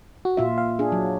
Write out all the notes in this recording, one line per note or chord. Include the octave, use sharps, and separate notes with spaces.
F#4
A#2 F4 E5
F5
D4 G#4
F#3